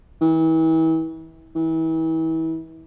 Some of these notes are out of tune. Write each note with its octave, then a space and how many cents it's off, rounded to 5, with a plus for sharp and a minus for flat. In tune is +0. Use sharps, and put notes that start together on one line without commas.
E3 -35
E3 -35